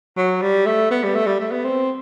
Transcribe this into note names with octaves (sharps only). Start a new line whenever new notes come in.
F#3
G3
A3
B3
G3
A3
G3
A3
B3
C4